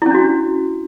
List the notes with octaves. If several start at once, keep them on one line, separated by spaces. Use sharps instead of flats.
C#4 D4 E4 F#4